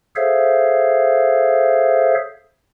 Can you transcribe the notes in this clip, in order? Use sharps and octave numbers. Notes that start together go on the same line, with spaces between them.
G#4 A4 C5 C#5 E5 F5